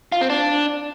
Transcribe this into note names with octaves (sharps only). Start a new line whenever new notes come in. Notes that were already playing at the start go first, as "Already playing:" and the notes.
F4
C4
D4